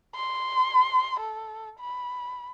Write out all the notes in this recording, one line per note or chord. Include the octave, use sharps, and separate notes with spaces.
C6
A4
B5